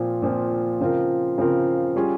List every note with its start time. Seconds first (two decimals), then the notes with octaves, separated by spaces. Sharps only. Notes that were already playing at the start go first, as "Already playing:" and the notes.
Already playing: A#2 F3 C4
0.22 A#2 F3 C4
0.80 C#3 F3 C4 F4 A#4
1.38 C#3 F3 C4 F4 A#4
1.96 G3 C#4 F4 G#4